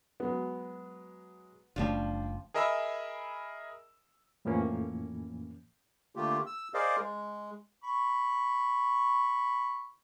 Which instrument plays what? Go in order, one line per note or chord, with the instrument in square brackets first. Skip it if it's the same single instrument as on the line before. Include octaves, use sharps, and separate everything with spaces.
[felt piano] F#3 G#3 [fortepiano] B3
[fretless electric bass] F#1 C#3 A3 [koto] F3 G3 F4 [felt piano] D4 D5
[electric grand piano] G#4 A#4 D#5 E5 B5 E6
[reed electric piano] F2 A2 E3 F3 A#3 C#4
[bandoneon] D3 A3 A#3 F4 G4
E6
G#4 A#4 C5 D5 D#5 F5
G#3
[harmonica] B5 C#6